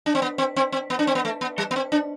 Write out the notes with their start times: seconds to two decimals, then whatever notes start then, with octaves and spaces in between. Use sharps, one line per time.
0.06 D4
0.15 C4
0.22 B3
0.38 C4
0.56 C4
0.72 C4
0.90 B3
0.99 D4
1.07 C4
1.15 B3
1.25 A3
1.41 B3
1.58 G3
1.71 B3
1.76 C4
1.92 D4